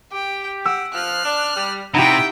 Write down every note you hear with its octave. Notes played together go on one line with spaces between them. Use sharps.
G4 G5
F#5 E6 D7
F3 F6 F#6
D4
G3
C3 D#4 E4 G4 F#5 G5